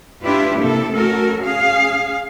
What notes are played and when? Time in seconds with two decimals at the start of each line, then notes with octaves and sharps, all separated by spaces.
0.24 D4 E4 F4 G4 B4
0.59 C3 A#3 E4 A4
0.93 A3 C#4 F#4 A4 A#4
1.42 C#4 G#4 F5